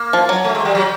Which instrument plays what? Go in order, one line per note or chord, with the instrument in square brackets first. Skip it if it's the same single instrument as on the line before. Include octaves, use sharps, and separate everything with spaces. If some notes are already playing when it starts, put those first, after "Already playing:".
Already playing: [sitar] A#3
[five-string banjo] F3
F#3
[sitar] A3
G#3
G3
F#3